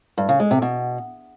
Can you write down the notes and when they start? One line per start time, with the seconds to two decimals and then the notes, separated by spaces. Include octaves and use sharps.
0.18 G2
0.29 C#3
0.40 G#3
0.51 C3
0.62 B2